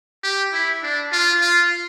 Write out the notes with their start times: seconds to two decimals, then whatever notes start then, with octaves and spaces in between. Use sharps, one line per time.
0.23 G4
0.53 E4
0.83 D4
1.12 F4
1.41 F4